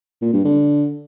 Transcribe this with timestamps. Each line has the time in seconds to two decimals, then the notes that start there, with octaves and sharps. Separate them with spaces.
0.22 A#2
0.33 G2
0.45 D3